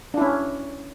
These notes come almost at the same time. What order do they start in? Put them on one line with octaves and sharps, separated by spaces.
D4 E4 C#4